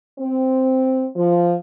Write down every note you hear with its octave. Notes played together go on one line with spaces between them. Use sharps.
C4
F3